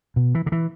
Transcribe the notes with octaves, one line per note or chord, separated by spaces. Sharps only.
B2
E3
D3
E3